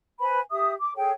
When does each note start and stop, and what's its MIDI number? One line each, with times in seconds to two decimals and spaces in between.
0.20 0.40 71
0.20 0.40 72
0.20 0.40 80
0.20 0.40 83
0.51 0.74 67
0.51 0.74 76
0.51 0.74 87
0.80 0.93 86
0.96 1.11 68
0.96 1.11 69
0.96 1.11 73
0.96 1.11 79